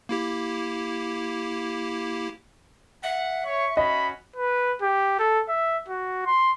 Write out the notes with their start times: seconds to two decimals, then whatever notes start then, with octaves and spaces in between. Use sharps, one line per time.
0.09 A#3 E4 G4
3.03 E5 F#5
3.46 C#5 C#6
3.77 C#4 F#4 D#5 B5
4.36 B4
4.82 G4
5.19 A4
5.49 E5
5.89 F#4
6.26 C6